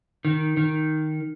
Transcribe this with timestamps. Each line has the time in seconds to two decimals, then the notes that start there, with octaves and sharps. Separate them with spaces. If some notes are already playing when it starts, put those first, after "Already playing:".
0.25 D#3
0.57 D#3